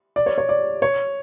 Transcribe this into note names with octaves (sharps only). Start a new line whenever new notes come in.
D5
C#5
C#5
D5
C#5